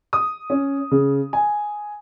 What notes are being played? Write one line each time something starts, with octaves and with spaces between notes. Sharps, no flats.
D#6
C#4
C#3
G#5